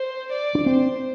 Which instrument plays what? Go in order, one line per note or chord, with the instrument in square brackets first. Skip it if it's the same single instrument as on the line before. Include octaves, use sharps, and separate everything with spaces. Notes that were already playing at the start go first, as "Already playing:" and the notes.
Already playing: [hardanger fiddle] C5
D5
[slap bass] D4
[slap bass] C4 [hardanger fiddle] C5